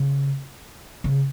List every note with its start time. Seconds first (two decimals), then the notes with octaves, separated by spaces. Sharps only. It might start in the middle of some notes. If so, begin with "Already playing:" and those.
Already playing: C#3
1.04 C#3